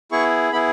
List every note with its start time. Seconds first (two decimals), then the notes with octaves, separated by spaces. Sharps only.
0.12 B3 E4 G#4 C#6
0.52 B3 E4 G#4 B5